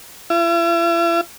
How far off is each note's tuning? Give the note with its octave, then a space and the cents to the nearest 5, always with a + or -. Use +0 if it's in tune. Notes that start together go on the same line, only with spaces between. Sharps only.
E4 +45